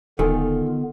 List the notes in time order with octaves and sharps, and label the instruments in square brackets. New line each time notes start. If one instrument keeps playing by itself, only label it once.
[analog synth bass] D#1 [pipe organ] D3 B3 [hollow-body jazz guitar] D#3 [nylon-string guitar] F4 A4 G#5